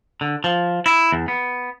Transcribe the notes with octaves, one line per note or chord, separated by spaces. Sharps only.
D3
F3
E4
E2
B3